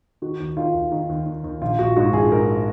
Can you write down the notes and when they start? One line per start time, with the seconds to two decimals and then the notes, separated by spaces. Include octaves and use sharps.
0.22 D#3 F#4
0.40 D#2
0.57 D#3 F4
0.74 D#2
0.92 D#3
1.09 D#2
1.26 D#2
1.44 D#2
1.61 A#1 F4
1.79 A#1 F#4
1.96 G#2 F#4
2.13 A#1 G#4
2.31 G#2 A#4